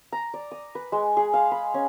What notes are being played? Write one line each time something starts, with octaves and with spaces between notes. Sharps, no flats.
A#5
D5
D#6
B4
G#3
G#4
F5
B5
C#4